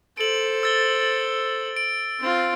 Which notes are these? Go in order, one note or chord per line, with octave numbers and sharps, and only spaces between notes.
A4 C5 D7 F#7
E6 A6 G7
D7
C4 F4